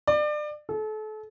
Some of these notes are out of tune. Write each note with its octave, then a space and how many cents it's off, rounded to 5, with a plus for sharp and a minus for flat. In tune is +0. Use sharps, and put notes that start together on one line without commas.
D5 +30
A4 -35